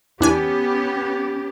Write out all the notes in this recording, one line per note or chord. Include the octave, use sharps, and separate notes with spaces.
E2 B3 C#4 D4 G4 G#5